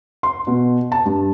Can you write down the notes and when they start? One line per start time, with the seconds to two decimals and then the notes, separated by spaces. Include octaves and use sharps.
0.23 C6
0.47 B2
0.92 A5
1.05 G2